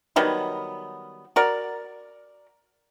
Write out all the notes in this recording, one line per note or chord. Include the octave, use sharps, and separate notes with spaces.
D#3 F#3 G3 B3
F#4 A#4 D5